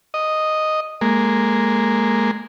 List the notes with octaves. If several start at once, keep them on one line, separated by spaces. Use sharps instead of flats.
D#5
G#3 A#3